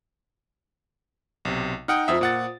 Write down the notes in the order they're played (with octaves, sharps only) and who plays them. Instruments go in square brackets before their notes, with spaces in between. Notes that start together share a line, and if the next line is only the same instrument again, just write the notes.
[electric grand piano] B1 C3
[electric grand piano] D#4 F#5 G5 [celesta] D#6 F6
[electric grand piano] F2 E5 [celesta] F4 C5 D#6
[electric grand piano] A#2 F#5 A6